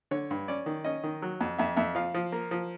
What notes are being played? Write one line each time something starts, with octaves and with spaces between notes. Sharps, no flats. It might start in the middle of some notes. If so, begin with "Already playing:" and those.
D3 C#5
G2
C#4 D5
D#3
C#4 D#5
D#3
F#3
F2
F2 E5
F2 E5
F3 F5
F3
A#3
F3